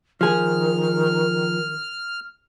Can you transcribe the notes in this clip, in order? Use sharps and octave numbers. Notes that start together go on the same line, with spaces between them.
D#3 F3 G#4 F6